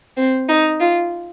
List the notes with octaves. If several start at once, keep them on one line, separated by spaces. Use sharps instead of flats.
C4
D#4
F4